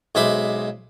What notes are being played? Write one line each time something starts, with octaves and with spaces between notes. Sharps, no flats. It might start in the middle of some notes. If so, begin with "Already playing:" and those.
B1 G#3 C5 E5 B5 D6